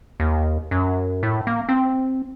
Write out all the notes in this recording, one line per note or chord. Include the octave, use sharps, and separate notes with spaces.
D#2
F#2
A2
A#3
C4